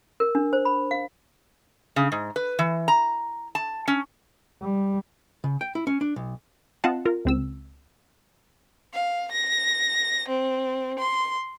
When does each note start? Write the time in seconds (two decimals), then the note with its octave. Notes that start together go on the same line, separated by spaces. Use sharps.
0.20 A#4
0.35 D4
0.53 C5
0.65 B5
0.91 F5
1.96 C#3
2.12 G#2
2.36 B4
2.59 E3
2.88 A#5
3.55 A5
3.88 C#4
4.62 G3
5.44 C#3
5.61 G5
5.75 E4
5.87 C#4
6.01 D4
6.16 B1
6.84 C4 F4 D#5 F5 F#5 A5
7.05 F4 A#4
7.25 C#2 C4 E6
8.94 F5
9.32 A#6
10.28 C4
10.99 C6